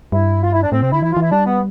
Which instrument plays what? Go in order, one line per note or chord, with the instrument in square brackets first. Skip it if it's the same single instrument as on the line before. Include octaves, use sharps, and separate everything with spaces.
[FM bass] G2 [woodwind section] E4
[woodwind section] F4
E4
D4
[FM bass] A2 [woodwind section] C4
[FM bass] C3 [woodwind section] C4
[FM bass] D3 [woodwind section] E4
[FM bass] E3 [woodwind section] E4
[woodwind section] F4
[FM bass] E3
[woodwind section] E4
[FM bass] G3 [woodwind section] D4
[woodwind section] B3